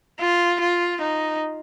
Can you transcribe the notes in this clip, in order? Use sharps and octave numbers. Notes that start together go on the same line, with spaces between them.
F4
F4
D#4